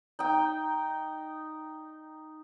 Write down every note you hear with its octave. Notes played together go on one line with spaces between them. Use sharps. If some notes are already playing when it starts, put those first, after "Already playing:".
D#4 G5